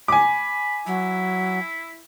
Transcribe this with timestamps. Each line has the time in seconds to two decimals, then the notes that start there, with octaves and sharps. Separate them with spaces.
0.08 G#5 B5 D6
0.86 F#3 E4